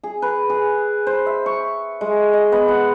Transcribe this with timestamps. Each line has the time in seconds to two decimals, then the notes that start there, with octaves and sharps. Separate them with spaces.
0.04 G#4
0.22 B4
0.50 G#4
1.07 C5
1.26 E5
1.46 C#6
2.01 G#3
2.33 D#5
2.52 B3
2.68 F#5